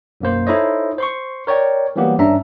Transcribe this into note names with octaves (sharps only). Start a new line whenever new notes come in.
B1 F#2 A#3 C5
D#4 E4 A4 C5 C#5 D#5
C5 C6 C#6
A#4 C#5 D5 G5
E3 F#3 G3 A#3 B3 G4
G#1 G2 C#4 D4 E5 A#5